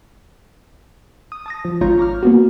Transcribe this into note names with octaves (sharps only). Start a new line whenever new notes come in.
D#6
A5 D#6 A#6
F3
G#1 G#2 F4 C#5 A#5 G6
C#5 A#5 D6 F6
A#3 B3 F#4